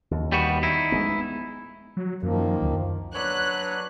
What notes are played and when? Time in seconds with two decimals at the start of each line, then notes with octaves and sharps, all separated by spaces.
0.11 D#2
0.32 G3 B3 F#4
0.63 D#4 E4
0.92 G#3 A3 B3
1.97 F#3
2.23 F#2 D#3 F3 A#3
2.62 D2
3.14 F#3 D4 B4 C#5 F#6